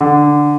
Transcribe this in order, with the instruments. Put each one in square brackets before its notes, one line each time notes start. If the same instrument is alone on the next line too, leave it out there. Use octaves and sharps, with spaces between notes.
[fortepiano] D3